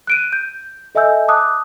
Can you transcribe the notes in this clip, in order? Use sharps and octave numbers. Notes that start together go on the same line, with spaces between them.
F#6 D7 D#7
G6
A4 D#5 E5 G#5 E6 G6
A5 D6 D#6 F#6